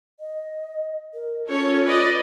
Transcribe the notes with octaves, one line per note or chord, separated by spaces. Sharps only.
D#5
A#4
C#4 F4 A4 C#5
B4 D5 D#5